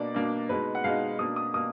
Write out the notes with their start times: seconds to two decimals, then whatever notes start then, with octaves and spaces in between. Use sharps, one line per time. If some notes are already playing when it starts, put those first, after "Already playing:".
Already playing: B2 A#3 D4 D5
0.14 B2 A#3 D4
0.49 B2 G#3 D#4 B4
0.75 F#5
0.84 B2 G#3 D#4 F5
1.19 B2 A#3 D4 D#6
1.36 D#6
1.54 B2 A#3 D#6